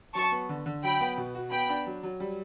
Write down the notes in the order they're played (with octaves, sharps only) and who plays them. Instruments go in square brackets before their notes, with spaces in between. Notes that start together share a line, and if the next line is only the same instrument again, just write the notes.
[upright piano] F#3 [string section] A5 C#6
[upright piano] B3
D3
D3
[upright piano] F#3 [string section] G5 B5
[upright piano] B3
B2
F#4
[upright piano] B3 [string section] G5 B5
[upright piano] D4
F#3
F#3
G3